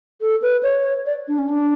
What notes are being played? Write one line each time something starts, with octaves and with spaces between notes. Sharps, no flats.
A4
B4
C#5
D5
D4
C#4
D4